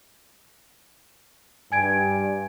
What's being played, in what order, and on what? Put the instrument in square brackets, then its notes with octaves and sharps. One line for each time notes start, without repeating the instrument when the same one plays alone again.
[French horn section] G2 [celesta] G#5 G#6 D7